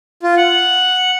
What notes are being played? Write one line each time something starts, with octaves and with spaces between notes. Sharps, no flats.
F4
F#5